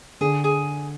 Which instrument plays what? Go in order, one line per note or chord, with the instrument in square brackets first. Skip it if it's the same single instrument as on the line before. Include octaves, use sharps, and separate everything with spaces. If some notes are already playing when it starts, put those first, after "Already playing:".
[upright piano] D3 [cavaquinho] G#4
[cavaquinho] G#4